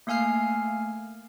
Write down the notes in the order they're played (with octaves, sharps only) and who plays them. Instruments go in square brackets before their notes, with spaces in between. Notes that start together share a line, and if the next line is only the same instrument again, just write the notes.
[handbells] A3 A#3 F5 G#5 F6 C7